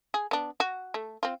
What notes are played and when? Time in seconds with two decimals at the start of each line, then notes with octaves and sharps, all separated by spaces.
0.14 G#4
0.31 B3 D4
0.60 F#4
0.94 A3
1.23 C4 F4